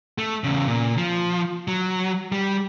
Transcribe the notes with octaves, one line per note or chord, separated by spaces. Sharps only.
A3
E2 C#3
A#2
F3
F#3
G3